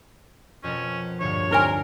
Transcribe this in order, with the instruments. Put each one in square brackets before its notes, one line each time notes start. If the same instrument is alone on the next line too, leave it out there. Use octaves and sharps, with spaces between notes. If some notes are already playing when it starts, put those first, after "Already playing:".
[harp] F2 B2 A#4 [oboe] C#4
[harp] D2 G2 A#2 [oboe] C#5
[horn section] C3 A#4 [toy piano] D#4 G#5 [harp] C6 B6